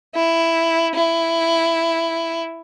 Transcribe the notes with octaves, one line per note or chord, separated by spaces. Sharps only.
E4
E4